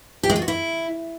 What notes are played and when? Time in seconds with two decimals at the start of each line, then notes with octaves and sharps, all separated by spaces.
0.23 G4
0.30 G#3
0.36 F4
0.42 F#4
0.48 E4